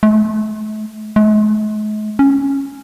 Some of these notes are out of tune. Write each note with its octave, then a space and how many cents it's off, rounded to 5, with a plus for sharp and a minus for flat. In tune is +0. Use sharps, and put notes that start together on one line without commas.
A3 -40
G#3 +45
C#4 -5